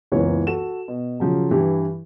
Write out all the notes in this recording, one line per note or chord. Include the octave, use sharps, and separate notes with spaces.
F#1 C#2 E3 B3 C#5
F#4 A4 E7
B2
C#3 F3 F#3
G2 E3 E4 G4